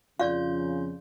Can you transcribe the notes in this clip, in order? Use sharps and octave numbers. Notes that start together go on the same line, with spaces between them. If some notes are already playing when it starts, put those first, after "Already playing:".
F2 C#3 F4 D5 F5 G6